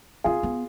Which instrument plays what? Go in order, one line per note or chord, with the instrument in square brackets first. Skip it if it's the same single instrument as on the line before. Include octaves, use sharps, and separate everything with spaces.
[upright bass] C4 [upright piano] F4 G#4
[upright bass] B3